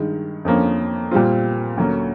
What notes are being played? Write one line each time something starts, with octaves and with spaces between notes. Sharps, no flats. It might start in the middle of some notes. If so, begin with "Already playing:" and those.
Already playing: G2 D#3 G#3
F2 D3 F3 A#3 C#4
A#2 G3 C4 F4
D2 D3 F#3 A#3 C#4